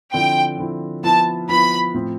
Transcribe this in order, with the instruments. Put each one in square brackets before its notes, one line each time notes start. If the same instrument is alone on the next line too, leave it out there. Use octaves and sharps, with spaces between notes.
[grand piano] D3 F3 C4 E4 [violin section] G5
[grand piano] D3 F3 C4 E4
[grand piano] F3 B3 E4 [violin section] A5
[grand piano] F3 B3 E4 [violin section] B5
[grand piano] A2 F3 C4